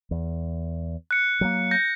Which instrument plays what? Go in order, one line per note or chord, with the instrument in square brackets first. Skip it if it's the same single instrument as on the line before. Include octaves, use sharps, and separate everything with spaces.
[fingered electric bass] E2
[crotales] F#6 C#7
[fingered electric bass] F#3 G3 A#3
[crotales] G6 A#6